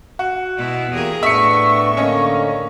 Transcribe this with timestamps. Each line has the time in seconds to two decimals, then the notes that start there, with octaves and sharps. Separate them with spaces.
0.19 F#4
0.58 B2 E4
0.93 E2 A#3 G4 G#4 A#4
1.23 A2 B3 D4 E5 C#6 C#7
1.97 D3 A#3 C#4 D#5